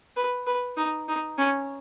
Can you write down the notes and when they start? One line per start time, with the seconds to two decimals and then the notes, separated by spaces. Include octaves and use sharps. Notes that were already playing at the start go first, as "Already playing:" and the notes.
0.16 B4
0.47 B4
0.77 D#4
1.08 D#4
1.38 C#4